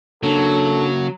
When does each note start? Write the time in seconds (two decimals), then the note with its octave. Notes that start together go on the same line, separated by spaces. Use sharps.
0.23 C#3 F#3 A#3 D4 A4